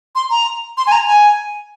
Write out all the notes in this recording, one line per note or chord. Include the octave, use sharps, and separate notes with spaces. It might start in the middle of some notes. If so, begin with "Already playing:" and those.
C6
A#5
C6
G#5
A#5
G#5